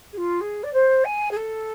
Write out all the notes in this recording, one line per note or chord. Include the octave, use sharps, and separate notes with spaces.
G#4
F4
G#4
D5
C5
G#5
G#4
A4